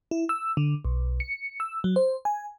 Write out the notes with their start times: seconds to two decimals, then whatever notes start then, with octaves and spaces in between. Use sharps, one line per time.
0.11 E4
0.29 E6
0.57 D3
0.85 B1
1.20 C#7
1.60 E6
1.84 F#3
1.96 C5
2.25 G#5